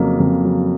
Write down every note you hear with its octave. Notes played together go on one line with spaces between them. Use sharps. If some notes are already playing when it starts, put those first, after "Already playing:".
Already playing: F2 C#3 F#3 A#3
F2
F#3